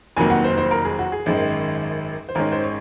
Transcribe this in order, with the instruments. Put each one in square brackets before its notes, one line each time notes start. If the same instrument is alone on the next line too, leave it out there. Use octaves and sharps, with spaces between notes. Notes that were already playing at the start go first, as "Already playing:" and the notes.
[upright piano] F1 F2 D#3 F#3 A#3 G#5
F#5
C5
C5
A#4
G#4
F#4
G#4
G#1 F#2 D#3 G#3
C5
G#1 G#2 D#3 G#3 C#4 A#4
C5
C#5